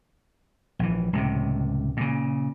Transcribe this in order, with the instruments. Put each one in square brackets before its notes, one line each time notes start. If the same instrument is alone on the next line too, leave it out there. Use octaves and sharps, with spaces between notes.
[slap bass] A#1 E3
C#2 A2 C3
A#2 C#3